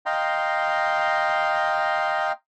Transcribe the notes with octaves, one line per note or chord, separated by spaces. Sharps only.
D#5 F5 G5 A#5 C6